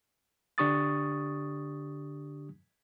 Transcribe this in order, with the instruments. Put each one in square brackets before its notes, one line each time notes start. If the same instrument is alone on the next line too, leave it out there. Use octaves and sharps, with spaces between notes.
[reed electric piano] D3 D4 G4 C#6 D#6 A6